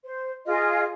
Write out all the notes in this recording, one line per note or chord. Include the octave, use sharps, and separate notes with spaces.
C5
F4 G#4 D#5